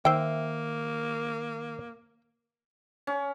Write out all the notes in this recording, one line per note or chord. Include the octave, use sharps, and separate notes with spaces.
D#3 A#3 C5 E5 G5
C#4